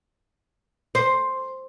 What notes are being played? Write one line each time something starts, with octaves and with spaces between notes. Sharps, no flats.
C5